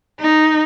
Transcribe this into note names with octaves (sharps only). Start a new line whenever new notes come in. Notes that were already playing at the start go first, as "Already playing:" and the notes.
D#4